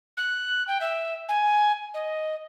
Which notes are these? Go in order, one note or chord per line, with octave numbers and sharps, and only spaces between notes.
F#6
G5
E5
G#5
D#5